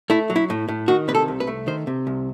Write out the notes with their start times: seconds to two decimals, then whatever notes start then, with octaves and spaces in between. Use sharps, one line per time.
0.10 A3 E4
0.30 F#3
0.36 E4
0.50 A2
0.68 A2
0.88 D#3 F#4
1.08 C3 B4
1.15 A4
1.28 C2
1.40 B4
1.47 A3
1.67 D#3 C5
1.87 C3
2.07 C2